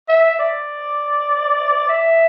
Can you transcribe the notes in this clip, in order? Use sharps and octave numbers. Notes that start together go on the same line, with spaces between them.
E5
D5
E5